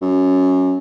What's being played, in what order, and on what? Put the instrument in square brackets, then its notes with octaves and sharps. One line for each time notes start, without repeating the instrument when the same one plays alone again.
[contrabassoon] F#2